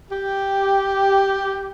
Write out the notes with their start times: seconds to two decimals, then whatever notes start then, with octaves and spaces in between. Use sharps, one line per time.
0.11 G4